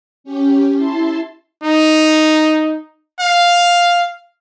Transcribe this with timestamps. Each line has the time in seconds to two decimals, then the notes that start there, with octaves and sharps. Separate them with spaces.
0.24 C#4 G4
0.75 E4 A5 C6
1.63 D#4
3.20 F5